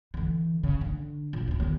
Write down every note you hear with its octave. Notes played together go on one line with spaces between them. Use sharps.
D3 E3
C#3
D3
A#1
D#2 G#2
D#2 B3